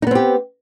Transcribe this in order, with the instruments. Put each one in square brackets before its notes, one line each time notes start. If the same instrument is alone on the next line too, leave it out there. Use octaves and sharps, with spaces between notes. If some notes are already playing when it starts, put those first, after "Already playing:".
[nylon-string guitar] D#4
B3
C4
G4